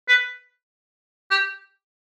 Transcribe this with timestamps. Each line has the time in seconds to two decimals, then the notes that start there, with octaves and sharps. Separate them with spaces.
0.09 B4
1.31 G4